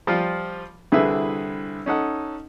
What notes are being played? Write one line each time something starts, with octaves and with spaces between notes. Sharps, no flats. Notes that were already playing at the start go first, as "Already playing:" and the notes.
F3 G3 F4
C2 D3 E4 G#4 B4 E5
C#4 D#4 A4 F#5